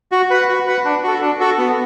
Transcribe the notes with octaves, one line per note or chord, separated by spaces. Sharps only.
F#4
B4 F#5
F#4
B4 F#5
D4
F#4 A4
D4
F#4 A4
B3